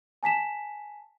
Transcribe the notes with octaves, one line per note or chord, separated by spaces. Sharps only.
G#5 A5 B6 E7